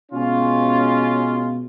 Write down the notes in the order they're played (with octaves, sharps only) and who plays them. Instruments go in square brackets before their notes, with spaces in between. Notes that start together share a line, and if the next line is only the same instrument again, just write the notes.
[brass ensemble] B2 G#3 C#4 F4